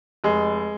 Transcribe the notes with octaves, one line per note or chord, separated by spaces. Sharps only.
F1 G#3